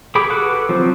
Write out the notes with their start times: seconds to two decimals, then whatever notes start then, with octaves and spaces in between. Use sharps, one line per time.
0.15 G4 G#4 B5 D6
0.30 F#4 A4 B4 D6 F#6
0.69 F3 F#3 C4